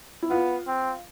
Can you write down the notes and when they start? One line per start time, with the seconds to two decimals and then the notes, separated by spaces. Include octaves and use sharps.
0.22 E4
0.30 B3 F4
0.67 C4